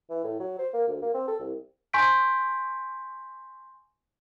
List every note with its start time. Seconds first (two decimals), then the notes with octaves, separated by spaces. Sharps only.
0.10 E3
0.24 A2
0.40 F#3
0.59 C5
0.74 A#3
0.88 D2
1.02 A#3
1.14 C4
1.28 A4
1.40 C2
1.93 G#5 C6 C#6 G6 B6 D7